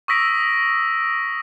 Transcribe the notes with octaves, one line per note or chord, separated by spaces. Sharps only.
C#6 D#6 E6 A#6 B6 D7